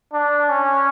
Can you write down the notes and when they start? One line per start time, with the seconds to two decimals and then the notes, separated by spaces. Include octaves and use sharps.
0.13 D4
0.49 C#4